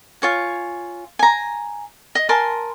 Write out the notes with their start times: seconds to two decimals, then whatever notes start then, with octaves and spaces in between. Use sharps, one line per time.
0.22 F4 C#5 G#5
1.19 G#5 A#5
2.15 D#5
2.29 A#4 G#5 A5 C6